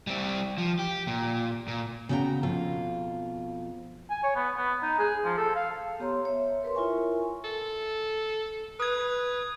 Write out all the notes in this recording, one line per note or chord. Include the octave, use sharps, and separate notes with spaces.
G3 C4
F3
G4
A#2
A#2
C#3 B3 F#4 G#4 G5 A#5
F2 B2 F4
G#5
C#5
B3
B3
D#4
G#4
F3
A4
F5
B3 G4 C#5 A#5 C6
C#5 E5
A#4 B4 C#5 C6
E4 F4 A#4 E5 G#5 C#6
A4
B4 D#6 G#6